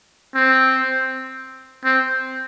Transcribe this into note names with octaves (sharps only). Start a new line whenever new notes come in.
C4
C4